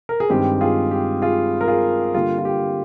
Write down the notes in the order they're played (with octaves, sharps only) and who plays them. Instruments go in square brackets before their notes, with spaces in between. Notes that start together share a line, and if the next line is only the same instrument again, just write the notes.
[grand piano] A#4
G#4
G2 D#3 G#3 C4 G4
F4 G#4
G4
F4 G#4
A#4
F4 G#4
D3 G3 A#3 F4
F4
G4